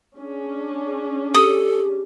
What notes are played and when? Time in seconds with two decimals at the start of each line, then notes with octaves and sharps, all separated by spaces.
0.16 C#4 D4 G#4
1.34 G4 A4 D#6